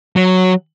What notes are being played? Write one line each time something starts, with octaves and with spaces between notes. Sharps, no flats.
F#3